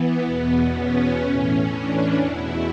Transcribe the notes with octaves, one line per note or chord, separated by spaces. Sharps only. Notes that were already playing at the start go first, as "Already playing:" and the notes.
Already playing: E3 B3
E2 B2
C#4
A2 E3
D4
E2 B2 E4